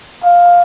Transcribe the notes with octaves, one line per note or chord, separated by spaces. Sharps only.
F5